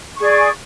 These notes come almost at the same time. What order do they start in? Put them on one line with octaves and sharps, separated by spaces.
C#6 G#4 D5